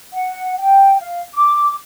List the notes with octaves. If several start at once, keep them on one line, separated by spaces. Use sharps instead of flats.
F#5
G5
F5
D6